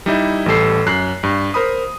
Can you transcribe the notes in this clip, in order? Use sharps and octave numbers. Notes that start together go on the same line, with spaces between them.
G3 D#4 E4
A1 G3 A4 C7
F#2 F#6 C7
G2
A#4 C5 B5 D#6